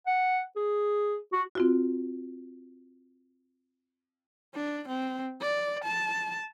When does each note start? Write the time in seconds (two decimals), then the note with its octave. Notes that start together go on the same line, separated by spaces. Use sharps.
0.07 F#5
0.56 G#4
1.32 F#4
1.55 C4 F4 F#4
4.55 D4
4.88 C4
5.41 D5
5.84 A5